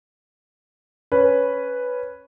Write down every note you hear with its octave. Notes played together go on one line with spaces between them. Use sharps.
C#4 B4